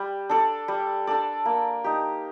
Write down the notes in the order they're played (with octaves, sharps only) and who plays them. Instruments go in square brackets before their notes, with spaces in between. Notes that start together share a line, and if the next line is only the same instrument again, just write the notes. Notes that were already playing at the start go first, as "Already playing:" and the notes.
Already playing: [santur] G3
D4 A4 D5
G3
D4 A4 D5
A#3
D#4 G4